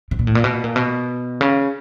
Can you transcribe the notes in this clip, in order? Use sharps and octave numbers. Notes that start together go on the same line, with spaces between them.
C3
A#2
A2
A#2
B2
A#2
B2
C#3